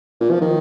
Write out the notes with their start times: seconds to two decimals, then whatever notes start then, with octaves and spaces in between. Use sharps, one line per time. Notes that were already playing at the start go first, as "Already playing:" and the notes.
0.21 A#2
0.31 F3
0.41 D#3